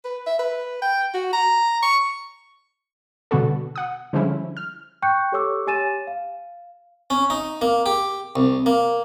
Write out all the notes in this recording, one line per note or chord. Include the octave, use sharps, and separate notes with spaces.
B4
E5
B4
G5
F#4
A#5
C#6
B2 D3 G3 B3 F#4 A4
F#5 D#6
D3 F3 G3 G#3 C#4 E4
F6
G5 C#6 F#6 G6 C#7
G4 A4 C#5 C#6 D6 E6
G4 C#5 G#5 A6 D#7 E7
F5
C#4
D#4
A#3
G4
C2
A#3